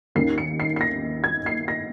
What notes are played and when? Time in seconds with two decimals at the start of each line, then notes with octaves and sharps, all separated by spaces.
0.15 D#2 D#3 A#3 C#4 C7
0.38 C#7
0.60 C7
0.76 C7
0.81 A#6
1.24 G#6
1.46 C7
1.68 A#6